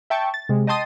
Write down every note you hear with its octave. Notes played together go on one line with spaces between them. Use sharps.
E5 G5 A5 C#6
A6
C3 G#3
D#5 G5 A5 C6 D#6 A6